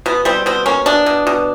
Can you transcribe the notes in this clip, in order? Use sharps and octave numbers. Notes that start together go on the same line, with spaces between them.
B2 B3
G3 C4
B2 C4
A#3 C#4
B2 D4
B2
B2